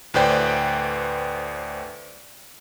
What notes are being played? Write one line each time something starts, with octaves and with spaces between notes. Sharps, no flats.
D2 A2 B4 C5 D5 G5